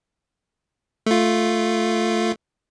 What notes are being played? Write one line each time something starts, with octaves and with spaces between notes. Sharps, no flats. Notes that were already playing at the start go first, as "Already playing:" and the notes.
A3 F4